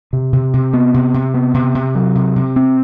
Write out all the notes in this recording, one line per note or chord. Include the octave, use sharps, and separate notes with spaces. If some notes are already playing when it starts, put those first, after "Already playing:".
C3
C3
C3
B3
C3
C3
B3
C3
C3
F#3
C3
C3
C4